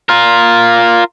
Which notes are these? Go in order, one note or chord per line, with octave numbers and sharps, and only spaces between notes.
F4 A#4